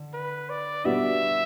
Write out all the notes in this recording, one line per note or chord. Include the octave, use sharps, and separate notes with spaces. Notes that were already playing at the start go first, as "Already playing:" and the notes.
Already playing: D3
B4
D5
B2 G3 B3 D4 E5